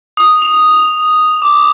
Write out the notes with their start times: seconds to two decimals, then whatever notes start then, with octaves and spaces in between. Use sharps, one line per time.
0.17 D#6
0.42 F7
1.42 D6